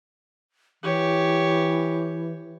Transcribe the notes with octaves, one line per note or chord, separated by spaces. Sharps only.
E3 G4 C#5